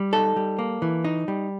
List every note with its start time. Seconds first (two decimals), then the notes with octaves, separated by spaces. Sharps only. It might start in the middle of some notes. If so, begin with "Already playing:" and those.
Already playing: G3
0.13 D#4 A4
0.36 G3
0.59 A#3
0.82 E3
1.05 D#4
1.28 G3